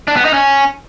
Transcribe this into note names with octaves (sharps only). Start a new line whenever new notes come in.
D4
B3
D#4
C#4